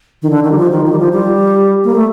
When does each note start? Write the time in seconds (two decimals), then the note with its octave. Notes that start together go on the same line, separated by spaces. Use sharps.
0.22 D#3
0.30 D3
0.44 D#3
0.52 G3
0.58 F3
0.71 D#3
0.85 D#3
0.92 G3
0.99 F3
1.13 G3
1.84 A#3
1.95 A3